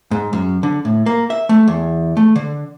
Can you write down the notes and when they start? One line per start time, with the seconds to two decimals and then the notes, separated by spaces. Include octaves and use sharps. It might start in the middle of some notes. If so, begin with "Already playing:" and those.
0.11 G#2
0.33 F#2
0.63 D3
0.85 A2
1.06 A#3
1.30 E5
1.49 A3
1.68 E2
2.17 A3
2.36 D3